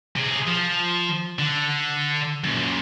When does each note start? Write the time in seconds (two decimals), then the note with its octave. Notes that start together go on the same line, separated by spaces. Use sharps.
0.16 C3 G#4
0.47 F3
1.39 D3
2.44 F#2 A#2